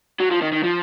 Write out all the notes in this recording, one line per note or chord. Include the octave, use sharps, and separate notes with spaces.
F#3
F3
D#3
D#3
F3